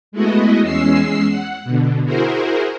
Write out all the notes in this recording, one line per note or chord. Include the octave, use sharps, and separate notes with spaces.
G#3 A3 B3 E4 F#4 D#5
E2 G#3 C#4 E6 C7
F#5
B2 D3
E4 F#4 G#4 A#4 C5